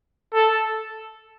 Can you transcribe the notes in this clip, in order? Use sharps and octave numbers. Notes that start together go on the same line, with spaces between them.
A4